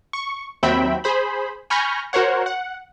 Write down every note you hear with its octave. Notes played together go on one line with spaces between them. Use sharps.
C#6
D#2 F#3 C4 E5 G5 B5
G#4 C5 B5
G#5 B5 C#6 F6 G6 A#6
F#4 A#4 C5 C#5 F#5
F#5